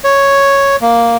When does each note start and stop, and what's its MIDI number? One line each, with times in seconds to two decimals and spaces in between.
0.04 0.76 73
0.81 1.17 58